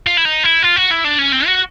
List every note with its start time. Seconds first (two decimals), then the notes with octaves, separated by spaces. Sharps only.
0.07 F4
0.17 E4
0.25 D#4
0.44 E4
0.62 F4
0.76 F#4
0.91 E4
1.04 D4
1.18 C#4
1.32 C4
1.46 F#4